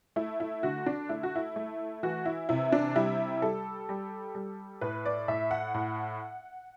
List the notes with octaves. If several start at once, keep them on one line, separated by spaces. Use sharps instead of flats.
A3 E4
E4
D3 F#4
D4
A3 E4
F#4
E4
A3
E3 F#4
E4
C3 E4
D4
G3 E4
G3 A4
G3
G3
A2 B4
D5
A2 E5
F#5
A2